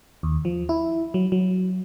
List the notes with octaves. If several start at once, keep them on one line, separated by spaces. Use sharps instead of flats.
D#2
F3
E4
F#3
F#3